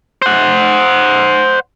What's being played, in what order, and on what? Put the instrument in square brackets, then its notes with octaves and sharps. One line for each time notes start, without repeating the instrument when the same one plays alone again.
[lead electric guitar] C5 F#5